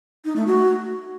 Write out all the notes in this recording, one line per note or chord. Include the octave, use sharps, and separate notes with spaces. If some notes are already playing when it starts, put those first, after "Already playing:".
D#4
A3
F#4